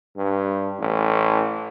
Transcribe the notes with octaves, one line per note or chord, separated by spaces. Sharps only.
G2
A1